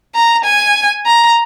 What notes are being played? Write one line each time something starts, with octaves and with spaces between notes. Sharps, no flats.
A#5
G#5
A#5